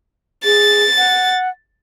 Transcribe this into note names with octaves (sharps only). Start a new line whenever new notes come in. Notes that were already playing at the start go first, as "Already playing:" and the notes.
G#4 A6
F#5